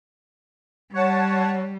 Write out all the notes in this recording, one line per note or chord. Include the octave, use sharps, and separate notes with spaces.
G3 C#5 F#5 A5